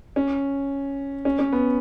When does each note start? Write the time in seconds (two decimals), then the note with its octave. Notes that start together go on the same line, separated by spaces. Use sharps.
0.16 C#4
1.25 C#4
1.39 C#4
1.53 B3